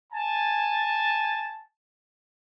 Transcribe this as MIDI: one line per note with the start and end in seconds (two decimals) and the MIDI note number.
0.13 1.62 80
0.13 1.62 81